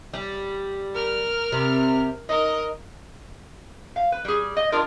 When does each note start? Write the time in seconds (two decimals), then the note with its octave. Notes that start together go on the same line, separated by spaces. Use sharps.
0.14 G3
0.94 A#4 F6
1.52 C3 G3
2.29 D#4 A#4 D#5
3.96 F5
4.12 B4
4.25 G3 G#4
4.57 D#5
4.72 D4 F4 G#4 A#4